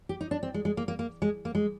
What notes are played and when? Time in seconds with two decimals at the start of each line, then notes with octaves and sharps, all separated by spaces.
0.09 G4
0.21 D#4
0.31 D4
0.43 C4
0.54 G#3
0.65 G#3
0.77 A#3
0.88 A#3
0.99 A#3
1.22 G#3
1.45 A#3
1.55 G#3